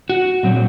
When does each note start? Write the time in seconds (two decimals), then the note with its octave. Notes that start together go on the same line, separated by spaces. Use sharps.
0.09 F#4
0.43 A#2 F#3 C4